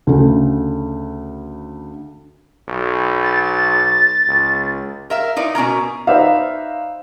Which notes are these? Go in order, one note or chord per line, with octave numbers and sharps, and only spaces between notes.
D2 C#3
B1
A6
C#2
A#4 E5 F5
D#4 E4 B4 D5
B2 C#4 A#4 A#5
D#4 B4 C5 D5 E5 F5